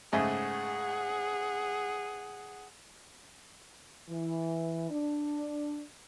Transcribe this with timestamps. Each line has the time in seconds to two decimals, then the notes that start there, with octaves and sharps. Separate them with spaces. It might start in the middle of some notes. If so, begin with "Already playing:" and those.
0.13 G#2 C#3 A3 G#4 F#5
4.09 E3
4.91 D4